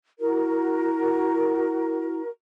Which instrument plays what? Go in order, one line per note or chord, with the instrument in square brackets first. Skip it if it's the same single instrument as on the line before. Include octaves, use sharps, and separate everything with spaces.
[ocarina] E4 [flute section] F#4 A#4